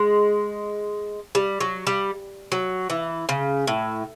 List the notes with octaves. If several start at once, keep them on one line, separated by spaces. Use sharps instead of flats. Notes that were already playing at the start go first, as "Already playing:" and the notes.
Already playing: G#3
G3
F#3
G3
F#3
E3
C#3
A2